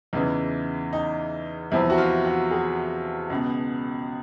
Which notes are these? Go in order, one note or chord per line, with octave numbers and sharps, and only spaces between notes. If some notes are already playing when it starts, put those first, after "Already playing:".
E2 C#3 E3 D#4
D#4
E2 C3 F3 E4
F#4
F4
F#4
G#4
C#2 B2